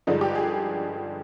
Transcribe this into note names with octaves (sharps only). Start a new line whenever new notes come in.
G2 D3 F3 G#3 D#4
G4
G#4